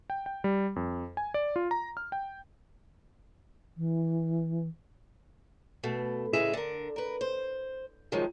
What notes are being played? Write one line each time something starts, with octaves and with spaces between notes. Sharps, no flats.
G5
G5
G3
F2
G#5
D5
F4
A#5
F6
G5
E3
B2 A3
A2 C#3 E3 G#3 G#4 E5
D3 A#4
A#4 B4
C5
C3 D#3 F3 F#3 G#3